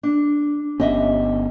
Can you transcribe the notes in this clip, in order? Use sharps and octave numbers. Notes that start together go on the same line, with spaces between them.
D4
G1 B3 C#4 G4 D#5 E5